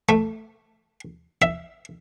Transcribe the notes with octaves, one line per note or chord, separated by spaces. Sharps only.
A3
E5